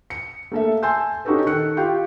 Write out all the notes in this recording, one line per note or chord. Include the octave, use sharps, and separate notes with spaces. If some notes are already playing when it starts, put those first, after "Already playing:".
C#7
A3 A#3 A4 E5
G#5 A5 C6 E6 G6
C#4 D#4 F#4 G4 A4 B4
D#3 A4 F#6 C#7
F4 G4 G5 C#6